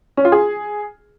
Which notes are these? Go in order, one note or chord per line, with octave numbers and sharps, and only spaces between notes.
C#4
F4
G#4